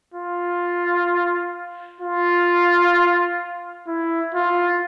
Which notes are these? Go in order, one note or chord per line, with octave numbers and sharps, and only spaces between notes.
F4
F4
E4
F4